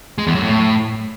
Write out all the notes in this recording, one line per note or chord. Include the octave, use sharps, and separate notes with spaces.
G#3
E2
F#2
A2